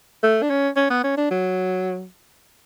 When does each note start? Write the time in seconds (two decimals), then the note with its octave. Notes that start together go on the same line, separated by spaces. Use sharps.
0.23 A3
0.43 D4
0.50 C#4
0.76 C#4
0.90 B3
1.04 C#4
1.17 D4
1.31 F#3